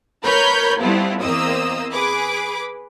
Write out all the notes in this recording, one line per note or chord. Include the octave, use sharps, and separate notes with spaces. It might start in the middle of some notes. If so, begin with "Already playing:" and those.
A#4 B4 C#5 B5 F6 G6
G3 A3 B3 C4 E4 F4
E2 A#3 C4 D#5 D#6 E6
G#4 B4 B5 D6